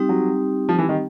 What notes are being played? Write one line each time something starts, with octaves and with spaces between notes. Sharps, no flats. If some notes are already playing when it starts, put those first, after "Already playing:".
Already playing: G3 C4 D#4 G4
F#3
F3
E3
D#3